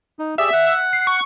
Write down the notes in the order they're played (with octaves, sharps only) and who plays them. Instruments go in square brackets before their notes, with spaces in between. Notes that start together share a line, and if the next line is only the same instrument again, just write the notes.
[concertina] D#4
[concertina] G4 G#4 D5 [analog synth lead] E5
[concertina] F#5
[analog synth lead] C7
C#6